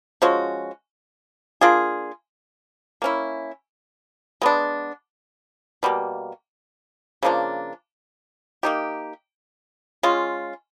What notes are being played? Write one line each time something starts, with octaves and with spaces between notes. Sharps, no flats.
F3 G#3 C#4 F#4
A#3 D4 F4 G#4
A#3 C#4 E4
G#3 B3 D4
B2 G3 A#3
C#3 F3 A#3 D4
A#3 D#4 G4
G#3 C#4 F4